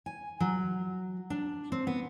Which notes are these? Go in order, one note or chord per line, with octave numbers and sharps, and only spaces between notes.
G#5
F#3
D4
C4
B3